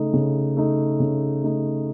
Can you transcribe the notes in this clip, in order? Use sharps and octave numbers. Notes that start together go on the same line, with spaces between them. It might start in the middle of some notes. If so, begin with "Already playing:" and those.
Already playing: C#3 A3 D#4
C#3
A3 D#4
C#3
A3 D#4